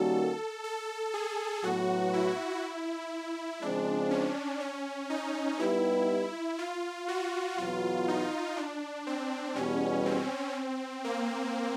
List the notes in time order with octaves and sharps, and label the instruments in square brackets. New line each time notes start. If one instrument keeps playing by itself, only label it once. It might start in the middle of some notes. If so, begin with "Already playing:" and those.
Already playing: [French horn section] D#3 G3 A#3 C#4 F#4 [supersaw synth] A4
[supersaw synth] A4
G#4
[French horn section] A2 F#3 B3 [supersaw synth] F#4
[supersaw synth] E4
[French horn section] C#3 F3 G#3 C4 [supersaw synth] D4
[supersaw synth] C#4
C#4
D#4
[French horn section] G3 B3 D#4 G4 B4 [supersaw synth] E4
[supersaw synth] F4
F#4
[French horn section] E2 B2 F#3 B3 [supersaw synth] F4
[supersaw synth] D#4
D4
C4
[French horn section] E2 B2 G3 [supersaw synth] C#4
[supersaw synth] C4
A#3